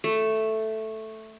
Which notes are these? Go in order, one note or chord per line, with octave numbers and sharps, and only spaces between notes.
A3